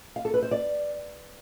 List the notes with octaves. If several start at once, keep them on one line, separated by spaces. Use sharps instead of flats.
F5
A4
B4
C5
D5